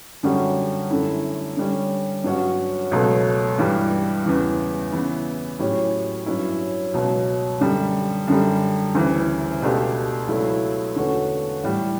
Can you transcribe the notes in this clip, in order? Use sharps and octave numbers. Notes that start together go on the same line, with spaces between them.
F#2 D3 G3 C#4 F#4
F#2 D3 A3 C#4 E4
D3 G3 C#4
G2 F#3 C#4 F#4
C#2 B2 F#3 A3
G2 E3 G3
E2 C#3 E3
C#3 E3 B3 E4
A2 F#3 C#4 E4 G4
G2 F#3 C#4 E4
C#2 B2 F#3
F#2 D3 G3
F#2 D3 G3
D2 C#3 E3
C#2 B2 A3 D4 G4
C#2 B2 F#3 A3 E4
E2 D3 A3 C#4 F#4
A2 E3 G3